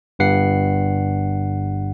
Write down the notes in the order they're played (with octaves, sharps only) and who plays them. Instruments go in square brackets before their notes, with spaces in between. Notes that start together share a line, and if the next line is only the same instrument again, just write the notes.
[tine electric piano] G1 G2 F#5 C7